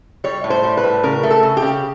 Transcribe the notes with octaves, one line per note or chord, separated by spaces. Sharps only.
G3 C#5
A2
C5
G3
B4
A2
C#3 A#4
A3
A4
C#3
G4
C#3